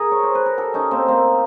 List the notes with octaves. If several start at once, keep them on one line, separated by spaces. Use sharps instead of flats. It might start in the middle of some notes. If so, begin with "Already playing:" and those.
Already playing: G#4 A#4
C#5
C5
B4
A#4
G4 A4
C#4 D#4
A#3 C4
A#3 C4